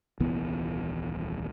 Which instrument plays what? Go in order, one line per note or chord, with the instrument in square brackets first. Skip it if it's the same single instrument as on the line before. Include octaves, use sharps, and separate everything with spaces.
[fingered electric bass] D#1 C2 E3 B3